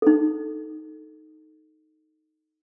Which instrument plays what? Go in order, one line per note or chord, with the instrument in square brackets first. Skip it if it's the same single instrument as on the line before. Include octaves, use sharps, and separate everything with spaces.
[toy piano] D#4 A4